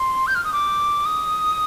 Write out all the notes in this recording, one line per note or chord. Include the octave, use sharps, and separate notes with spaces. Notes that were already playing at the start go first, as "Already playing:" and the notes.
Already playing: C6
G6
F6
D#6
D6
D#6